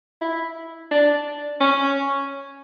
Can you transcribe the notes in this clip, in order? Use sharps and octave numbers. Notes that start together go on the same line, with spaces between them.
E4
D4
C#4